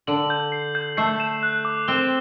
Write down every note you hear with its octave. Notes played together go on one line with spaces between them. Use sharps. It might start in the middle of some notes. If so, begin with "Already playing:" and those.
D3 F#7
G6
C7
G6
A3 C7
E7
F#6
D6
C4 G7